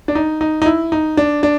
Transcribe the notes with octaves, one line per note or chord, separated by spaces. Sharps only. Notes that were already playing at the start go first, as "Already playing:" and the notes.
D4
D#4
D#4
D#4
E4
D#4
D4
D4